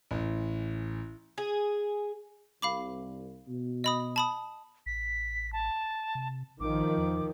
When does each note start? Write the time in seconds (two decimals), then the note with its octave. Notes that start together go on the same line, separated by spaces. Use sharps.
0.11 A1
1.38 G#4
2.62 C2 F5 B5 D6
3.48 B2
3.84 D#5 B5 D#6
4.16 A5 B5 D#6
4.86 A1 B6
5.53 A5
6.15 C3
6.60 A#1 D#3 F3 D6
6.97 E2